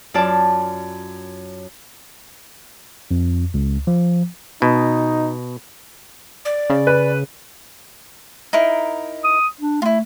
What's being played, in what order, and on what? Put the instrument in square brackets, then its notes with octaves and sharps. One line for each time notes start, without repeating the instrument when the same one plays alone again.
[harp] F#2 F4 D5 A5
[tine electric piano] F2
C#2
F3
[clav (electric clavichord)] B2 [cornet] D#4
[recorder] D5
[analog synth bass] C#3
[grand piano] B4
[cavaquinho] D#4 E4 A#4
[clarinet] D#6
D4
[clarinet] A3 [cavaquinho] E4 F4